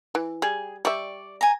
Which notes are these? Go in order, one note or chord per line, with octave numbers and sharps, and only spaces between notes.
E3
G3 G#4
G3 D5 E5 C#6
G#5 A#5